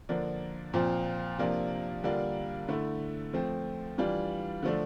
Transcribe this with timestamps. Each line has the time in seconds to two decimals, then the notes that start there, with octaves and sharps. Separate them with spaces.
0.09 D3 F3 A#3 D4
0.74 A#2 F3 C4 F4
1.38 C3 F3 A#3 D4 F4
2.04 D3 G3 A#3 D4 F4
2.68 D3 A3 E4
3.33 F3 A3 C4
3.98 E3 G3 D4 F4
4.63 D3 F3 A3 D4